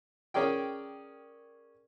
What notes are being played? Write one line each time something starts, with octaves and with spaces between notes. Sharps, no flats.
C#4 G#4 A#4 D5 G5